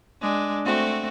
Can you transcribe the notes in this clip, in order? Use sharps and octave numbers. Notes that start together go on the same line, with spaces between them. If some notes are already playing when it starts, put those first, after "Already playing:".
G#3 D4
A3 C4 F#4